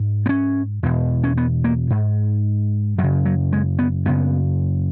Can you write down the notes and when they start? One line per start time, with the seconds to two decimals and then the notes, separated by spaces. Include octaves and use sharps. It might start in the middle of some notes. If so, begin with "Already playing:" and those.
Already playing: G#2
0.26 B3
0.29 C#4
0.83 E2 B2
1.24 C#4
1.37 B3
1.64 A#3
1.90 G#2
2.98 F#2 F#3
3.03 C#3
3.25 F#3
3.53 G#3
3.79 B3
4.06 F#2 C#3 B3